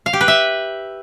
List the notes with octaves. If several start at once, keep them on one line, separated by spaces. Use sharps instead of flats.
F5
G4
B4
E5